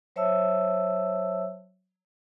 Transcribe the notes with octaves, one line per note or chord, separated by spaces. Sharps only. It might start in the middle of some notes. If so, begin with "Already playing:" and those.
F#3 C5 C#5 E5 A5 E6